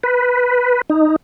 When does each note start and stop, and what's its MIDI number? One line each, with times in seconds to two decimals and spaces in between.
0.03 0.81 71
0.90 1.16 63